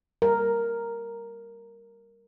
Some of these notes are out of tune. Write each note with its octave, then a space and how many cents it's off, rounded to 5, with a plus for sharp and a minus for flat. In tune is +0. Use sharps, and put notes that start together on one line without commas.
G3 +0 A#4 +0